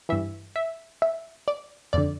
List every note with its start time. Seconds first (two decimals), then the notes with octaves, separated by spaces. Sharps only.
0.09 G2 E3 E5
0.56 E5
1.02 E5
1.48 D5
1.93 F2 D3 D5